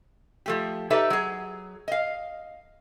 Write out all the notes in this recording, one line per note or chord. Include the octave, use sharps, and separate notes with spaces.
F3 A3 G4
D#4 G4 A4 B4 D5 E5
F#3 G#4
D#5 F5